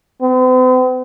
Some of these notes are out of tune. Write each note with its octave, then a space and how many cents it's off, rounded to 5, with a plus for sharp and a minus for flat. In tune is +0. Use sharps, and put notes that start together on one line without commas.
C4 -45